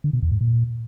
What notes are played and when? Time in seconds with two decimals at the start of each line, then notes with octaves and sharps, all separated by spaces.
0.04 D3
0.13 B2
0.22 E2
0.32 G#2
0.41 A#2